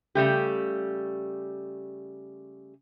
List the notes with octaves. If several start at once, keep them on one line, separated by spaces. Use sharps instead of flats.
C#3 G3 A3 G4